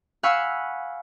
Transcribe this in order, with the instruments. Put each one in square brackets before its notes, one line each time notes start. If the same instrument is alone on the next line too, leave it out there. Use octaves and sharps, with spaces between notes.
[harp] F5 F#5 G#5 B5 C#6 E6